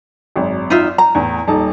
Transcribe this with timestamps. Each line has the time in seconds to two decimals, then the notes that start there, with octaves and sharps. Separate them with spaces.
0.36 G#1 F#2
0.70 D#4 F4 E5
0.98 A#5
1.15 E2 A2
1.48 D#1 D#4 A5